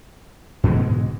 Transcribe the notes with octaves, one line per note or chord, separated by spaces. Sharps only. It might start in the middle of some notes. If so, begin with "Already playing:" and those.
G#2 B2 D3 G#3